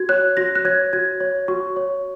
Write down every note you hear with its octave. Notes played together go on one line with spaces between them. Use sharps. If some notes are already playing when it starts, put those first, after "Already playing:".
Already playing: F#4 G#6
C#5 F#6
F#4 A#6
F#6
C#5 G#6
F#4 G#6
C#5
F#4 C#6
C#5